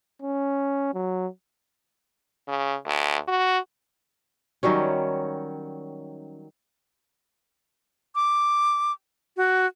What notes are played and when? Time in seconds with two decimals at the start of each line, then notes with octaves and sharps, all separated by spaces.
0.22 C#4
0.94 F#3
2.48 C#3
2.86 D2
3.28 F#4
4.63 D#3 F#3 G3 C#4
8.15 D6
9.37 F#4